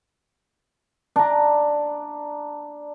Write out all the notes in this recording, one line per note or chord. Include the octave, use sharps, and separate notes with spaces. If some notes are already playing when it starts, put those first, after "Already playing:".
D4 A#5